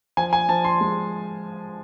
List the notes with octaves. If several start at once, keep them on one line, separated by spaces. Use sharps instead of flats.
F3 G#5
G#5
F3 A5
C6
G#3